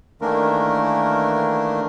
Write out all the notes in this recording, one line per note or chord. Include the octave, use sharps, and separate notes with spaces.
D#3 E3 A3 A#3 D4 A#4